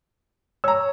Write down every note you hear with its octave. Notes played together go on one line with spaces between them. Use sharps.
C#5 A#5 E6